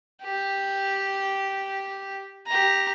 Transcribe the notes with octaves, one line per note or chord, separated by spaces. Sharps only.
G4
G4 A#5